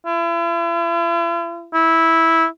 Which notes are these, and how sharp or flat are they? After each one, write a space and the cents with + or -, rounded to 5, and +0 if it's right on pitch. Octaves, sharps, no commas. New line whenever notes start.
E4 +45
E4 -10